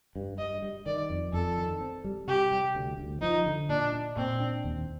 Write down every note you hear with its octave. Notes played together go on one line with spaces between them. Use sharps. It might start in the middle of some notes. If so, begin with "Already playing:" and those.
G2
G2 D#5
G3
D#3 D5
F2
F2 A4
D#3
C4
G3
C3 G4
G3
D2
D2
F3 D#4
D3
A#2 D4
D4
A#2 C4
D4
D#2